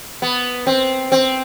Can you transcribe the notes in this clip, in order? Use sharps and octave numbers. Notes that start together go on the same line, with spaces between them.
B3
C4
C4